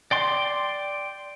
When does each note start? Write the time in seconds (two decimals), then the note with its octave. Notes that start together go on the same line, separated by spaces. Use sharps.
0.11 D5 G5 C6